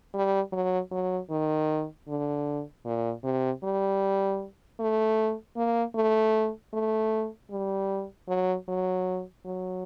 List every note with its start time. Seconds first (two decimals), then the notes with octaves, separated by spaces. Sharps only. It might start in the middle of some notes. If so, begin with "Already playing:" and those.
0.14 G3
0.52 F#3
0.91 F#3
1.30 D#3
2.08 D3
2.85 A#2
3.24 C3
3.63 G3
4.79 A3
5.56 A#3
5.95 A3
6.73 A3
7.50 G3
8.28 F#3
8.68 F#3
9.45 F#3